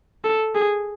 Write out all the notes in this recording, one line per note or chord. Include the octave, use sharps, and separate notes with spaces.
A4
G#4